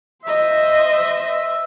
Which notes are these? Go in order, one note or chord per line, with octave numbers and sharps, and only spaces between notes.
C5 D#5 E5